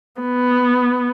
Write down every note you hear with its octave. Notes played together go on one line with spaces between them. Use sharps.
B3